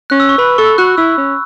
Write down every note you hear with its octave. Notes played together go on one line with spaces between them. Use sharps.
C#4 F#6
E6
C#6
B4 B5
A4 C#6
F#4 F#6
E4 E6
C#4